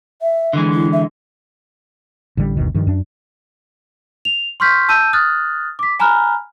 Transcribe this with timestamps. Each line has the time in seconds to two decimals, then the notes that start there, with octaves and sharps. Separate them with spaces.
0.21 E5
0.53 D3 E3 G#3
0.73 E4
0.92 E5
2.37 A1 D3 F#3 G3
2.57 F#1 D2 B2 D#3
2.74 G2 D#3 F3
2.87 F#2 D4
4.25 F7
4.60 C6 C#6 F6 G6 B6
4.89 A5 E6 G6 D#7
5.13 D#6 F6 F#6 A6
5.79 D6 B6
6.00 G#5 A#5 B5 F6 F#6